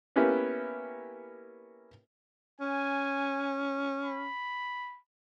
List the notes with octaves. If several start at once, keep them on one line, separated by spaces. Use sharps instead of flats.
A#3 B3 C#4 E4 G4
C#4 G#5
B5